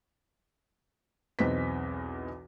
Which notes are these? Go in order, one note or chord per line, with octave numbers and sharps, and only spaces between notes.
B1 E2 C4 D#4 B4 B6